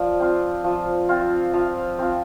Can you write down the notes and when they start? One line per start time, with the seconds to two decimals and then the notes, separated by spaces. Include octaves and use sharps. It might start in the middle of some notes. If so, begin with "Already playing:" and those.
Already playing: F3 D5
0.20 C4 F4
0.64 F3
1.09 C4 F4
1.54 F3 F5
1.99 C4 F4